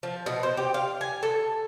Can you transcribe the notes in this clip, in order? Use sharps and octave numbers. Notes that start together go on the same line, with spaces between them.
F3
B2
C5
G4
F5
G#5
A4